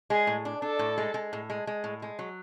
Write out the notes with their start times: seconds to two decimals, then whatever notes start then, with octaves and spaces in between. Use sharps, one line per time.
0.10 G#3 G#4
0.27 A2
0.45 D4
0.62 D4 A4
0.79 A2
0.98 G#3
1.14 G#3
1.33 A2
1.50 G#3
1.67 G#3
1.84 A2
2.02 G#3
2.19 F#3